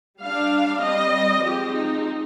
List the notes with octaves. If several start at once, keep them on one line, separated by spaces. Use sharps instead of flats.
G3 D4 F5
G3 C4 D#5
F3 G#3 C4 G4
D#4